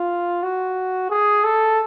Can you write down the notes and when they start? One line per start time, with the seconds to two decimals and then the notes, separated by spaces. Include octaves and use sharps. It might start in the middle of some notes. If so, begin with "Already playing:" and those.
Already playing: F4
0.43 F#4
1.10 G#4
1.44 A4